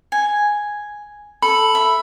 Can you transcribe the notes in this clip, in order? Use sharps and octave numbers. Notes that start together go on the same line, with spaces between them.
G#5
A4 B5
E5